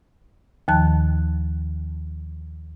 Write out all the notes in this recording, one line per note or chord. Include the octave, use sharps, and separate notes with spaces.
D#2 D#3 F3 A5 F#6